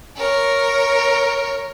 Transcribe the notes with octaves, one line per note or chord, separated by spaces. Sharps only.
A#4 C#5